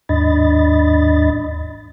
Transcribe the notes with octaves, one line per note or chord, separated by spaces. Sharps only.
D#2 G#2 D4 D#5 B5 A6